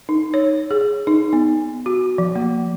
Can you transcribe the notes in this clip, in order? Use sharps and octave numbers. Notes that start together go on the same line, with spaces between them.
D#4
C#5
G#4
D#4
B3
F#4
F3
A#3